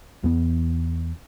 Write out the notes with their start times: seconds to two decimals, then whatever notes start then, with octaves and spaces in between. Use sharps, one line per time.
0.24 E2 B3